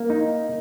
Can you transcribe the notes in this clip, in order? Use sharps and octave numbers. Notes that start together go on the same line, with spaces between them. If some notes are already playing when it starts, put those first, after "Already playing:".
Already playing: A#3
D#4